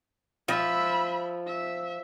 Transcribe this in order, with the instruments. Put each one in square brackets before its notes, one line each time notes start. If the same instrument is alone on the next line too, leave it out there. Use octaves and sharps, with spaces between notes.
[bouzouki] F3 [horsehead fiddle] E5 B5
[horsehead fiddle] E5